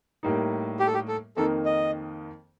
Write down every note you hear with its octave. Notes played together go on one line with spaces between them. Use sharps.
A2 G3 A#3 D#4
G4
A4
G4
A4
F2 D#3 A#3 D#4 A4
D#5